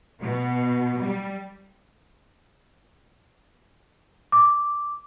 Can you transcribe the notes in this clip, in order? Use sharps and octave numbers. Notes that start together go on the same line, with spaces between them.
B2
G3
D6